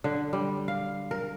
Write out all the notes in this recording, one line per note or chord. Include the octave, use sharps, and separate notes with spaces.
D3
G3
F5
A#4